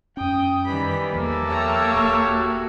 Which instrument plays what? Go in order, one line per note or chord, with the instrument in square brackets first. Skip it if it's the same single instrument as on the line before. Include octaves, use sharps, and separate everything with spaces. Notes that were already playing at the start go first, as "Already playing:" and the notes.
[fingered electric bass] F#2 C#4 [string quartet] G5 D#6
[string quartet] D#3 E3 G3 [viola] B5
[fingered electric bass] E2 F3 [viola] A#3 A4
[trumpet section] G4 C#5 E5 [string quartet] A5 A#5
[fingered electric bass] D#1
[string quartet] F#4